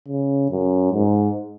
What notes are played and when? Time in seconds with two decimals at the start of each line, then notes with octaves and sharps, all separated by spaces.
0.08 C#3
0.50 F#2
0.92 G#2